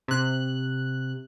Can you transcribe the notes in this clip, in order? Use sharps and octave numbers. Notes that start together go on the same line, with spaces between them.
C3 F#6